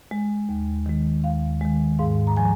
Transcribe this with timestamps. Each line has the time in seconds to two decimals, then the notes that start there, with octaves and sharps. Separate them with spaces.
0.11 G#3
0.49 D#2
0.86 D#3 G#3
1.24 D#2 F5
1.61 D#3 G#3
1.99 G#2 F5
2.27 A#5
2.37 F3 G#5